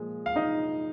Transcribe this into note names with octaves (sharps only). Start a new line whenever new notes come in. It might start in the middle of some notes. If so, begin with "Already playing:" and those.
Already playing: A#2 F3 G#3
F5
D#4 D#5